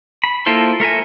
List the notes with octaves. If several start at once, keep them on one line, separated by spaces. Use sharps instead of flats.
B5
A#3 E4 F4 A4 C5
A3 A#4 E5 G#5